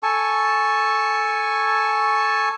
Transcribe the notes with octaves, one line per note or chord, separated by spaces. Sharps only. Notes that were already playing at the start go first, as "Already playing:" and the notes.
A4 G#5 A5 C#6